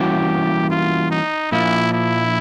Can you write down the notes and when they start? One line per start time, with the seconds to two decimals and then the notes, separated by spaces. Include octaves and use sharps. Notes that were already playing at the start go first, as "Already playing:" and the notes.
Already playing: E3 G3 A#3 C#4 F#4 G4
0.71 F4
1.11 D#4
1.52 A#2 F3 A#3 E4
1.93 E4